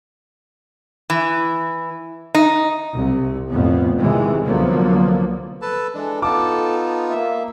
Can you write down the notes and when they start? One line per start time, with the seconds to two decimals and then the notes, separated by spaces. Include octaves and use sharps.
1.10 E3
2.35 D#4
2.96 C2 C3
3.50 F2 A2 B3
3.98 C3 D#3 E3 G#3
4.44 C2 D3 F3 F#3 A#3 B3
5.62 A4 B4 A5
5.94 E3 G#3 D4 A4
6.22 B3 D#4 F4 A4 A5 D6
7.11 A#3 E5